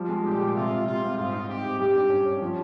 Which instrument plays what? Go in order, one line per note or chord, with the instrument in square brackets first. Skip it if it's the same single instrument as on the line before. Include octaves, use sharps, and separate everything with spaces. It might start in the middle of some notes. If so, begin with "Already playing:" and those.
Already playing: [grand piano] F3 G3
G#3
[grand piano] A#2 [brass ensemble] G4
[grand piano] G#3
[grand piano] C3 [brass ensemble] F4
[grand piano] C3
[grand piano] G3 [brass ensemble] F4
[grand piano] C4
[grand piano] G#2 [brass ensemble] F4
[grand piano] D#4
[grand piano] C4 [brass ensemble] G4
[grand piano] G#2
[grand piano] G3 [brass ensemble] G4
[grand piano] G2
C#4
C#4
F3